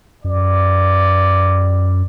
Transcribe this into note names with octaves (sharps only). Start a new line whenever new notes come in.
F#2 D5